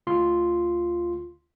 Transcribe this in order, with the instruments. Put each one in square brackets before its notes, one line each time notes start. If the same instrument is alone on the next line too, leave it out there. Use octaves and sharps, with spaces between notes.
[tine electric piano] D2 F4 C6